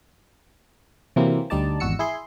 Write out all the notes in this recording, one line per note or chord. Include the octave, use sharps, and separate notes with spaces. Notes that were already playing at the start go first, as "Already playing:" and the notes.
C3 E3 F#3 A#3 C4
D2 G3 D#4 D5 A5
G#1 E2 F#4 E6 C#7
E4 G#4 C6